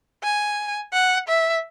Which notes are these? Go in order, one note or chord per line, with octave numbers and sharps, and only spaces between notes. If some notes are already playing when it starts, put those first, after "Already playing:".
G#5
F#5
E5